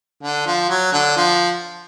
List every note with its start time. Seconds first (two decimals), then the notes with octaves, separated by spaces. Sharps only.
0.23 D3
0.46 F3
0.69 F#3
0.93 D3
1.16 F3